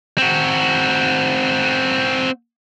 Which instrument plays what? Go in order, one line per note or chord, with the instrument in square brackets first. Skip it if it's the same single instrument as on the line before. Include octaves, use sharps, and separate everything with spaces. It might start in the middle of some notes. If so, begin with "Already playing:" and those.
[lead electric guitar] C4 F#4